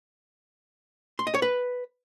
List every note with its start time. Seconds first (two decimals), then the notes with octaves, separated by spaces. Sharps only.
1.19 C6
1.27 D#5
1.34 C#5
1.42 B4